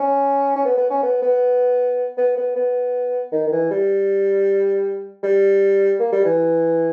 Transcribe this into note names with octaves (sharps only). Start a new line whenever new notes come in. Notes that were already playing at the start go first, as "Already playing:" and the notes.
Already playing: C#4
C#4
B3
B3
C#4
B3
B3
B3
B3
B3
D#3
D#3
E3
G3
G3
A#3
G3
E3